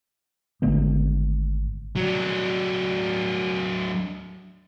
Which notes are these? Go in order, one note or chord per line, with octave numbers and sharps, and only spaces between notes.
G#1 D3 A3 B3
F#3 D4